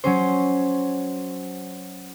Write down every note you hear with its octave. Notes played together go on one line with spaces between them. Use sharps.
F#3 C#4 C5